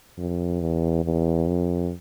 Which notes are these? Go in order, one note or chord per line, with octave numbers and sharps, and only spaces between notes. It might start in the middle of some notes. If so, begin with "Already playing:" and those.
F2
E2
E2
F2